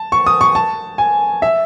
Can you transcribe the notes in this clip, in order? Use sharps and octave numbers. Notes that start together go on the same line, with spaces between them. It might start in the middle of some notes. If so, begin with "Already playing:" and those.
Already playing: A5
C#6
D#6
C#6
A5
G#5
E5